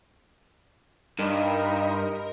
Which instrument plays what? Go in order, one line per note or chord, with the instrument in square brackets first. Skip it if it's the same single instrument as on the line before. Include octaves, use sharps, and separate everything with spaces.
[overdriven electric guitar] G2 [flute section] D#4 B5 C6 [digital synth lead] A#4 [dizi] D#5